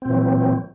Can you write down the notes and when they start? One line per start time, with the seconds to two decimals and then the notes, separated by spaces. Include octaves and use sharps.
0.02 C4
0.05 A#2
0.09 E3
0.13 F#3